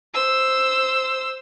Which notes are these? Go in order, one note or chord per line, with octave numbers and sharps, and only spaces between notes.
C5 E6